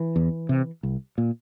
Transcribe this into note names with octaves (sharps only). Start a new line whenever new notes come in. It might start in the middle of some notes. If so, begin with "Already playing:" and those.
Already playing: E3
E2
C3
C2
A#2